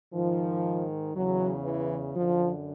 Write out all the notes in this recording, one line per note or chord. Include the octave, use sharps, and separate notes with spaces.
G#2 D#3 F3
E2 C#3 E3 F#3
E3
F#2 D3 F3